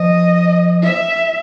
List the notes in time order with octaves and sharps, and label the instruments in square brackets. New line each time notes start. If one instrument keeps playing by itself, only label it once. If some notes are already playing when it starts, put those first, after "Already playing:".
Already playing: [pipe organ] F3 [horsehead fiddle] D#5
[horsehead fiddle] E5